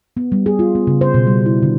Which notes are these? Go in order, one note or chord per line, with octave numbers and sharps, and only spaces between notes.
B3
G3
G#4
F4
B3
C#3
C5
B2
G3
E4
D3